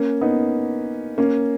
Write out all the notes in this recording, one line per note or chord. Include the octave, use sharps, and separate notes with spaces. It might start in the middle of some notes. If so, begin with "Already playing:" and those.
Already playing: A#3 C#4
B3 D#4
A#3 C#4